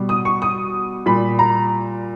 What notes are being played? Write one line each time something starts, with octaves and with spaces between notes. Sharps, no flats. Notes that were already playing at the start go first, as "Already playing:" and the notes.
Already playing: B2 G3
D#6
C#6
D#6
A#2 G3 B5
A#5